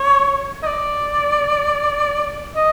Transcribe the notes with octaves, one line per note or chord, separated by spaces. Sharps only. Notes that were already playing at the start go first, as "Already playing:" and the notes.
Already playing: C#5
D#5
D5
D#5